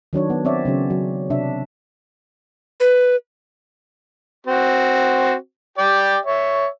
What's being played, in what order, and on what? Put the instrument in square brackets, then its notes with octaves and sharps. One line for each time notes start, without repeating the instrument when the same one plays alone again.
[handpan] D#3 F#3 D4 C#5
B3
C4 C#5 D5 E5
C#3 F#3 C#4
F#3
C3 D4 E5
[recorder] B4
[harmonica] C4 F#4
G4 D5 G5
C#5 E5